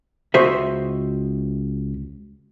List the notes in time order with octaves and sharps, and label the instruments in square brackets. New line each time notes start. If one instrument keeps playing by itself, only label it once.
[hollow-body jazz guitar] C#2 F#4 C5 D#5 E5